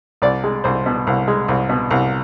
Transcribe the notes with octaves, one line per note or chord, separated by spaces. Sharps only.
C2 D5
G#3
C2 C5
B2
C2
G#3
C2
B2
C2